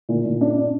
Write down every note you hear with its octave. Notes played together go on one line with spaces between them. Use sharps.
A#2
A#2
D4
D4